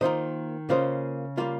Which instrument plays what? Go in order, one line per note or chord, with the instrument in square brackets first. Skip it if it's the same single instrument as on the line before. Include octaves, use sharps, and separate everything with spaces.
[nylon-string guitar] D#3 [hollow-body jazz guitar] A#3 F4 C5 D#5
[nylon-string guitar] C#3 [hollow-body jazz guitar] A#3 F4 C5 D#5
[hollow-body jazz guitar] G3 A#3 F4